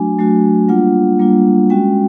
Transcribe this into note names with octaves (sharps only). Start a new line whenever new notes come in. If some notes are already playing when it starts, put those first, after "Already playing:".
Already playing: F#3 A3 D4 F#4 G#5
F#3 A3 D4 F#4
G3 A#3 D4 F4 F#5
G3 A#3 D4 F4
G#3 C#4 F#4 G5